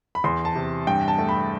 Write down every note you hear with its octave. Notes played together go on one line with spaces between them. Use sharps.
B5
E2 C6
A5
C3
G2 G5
A5
A3
B5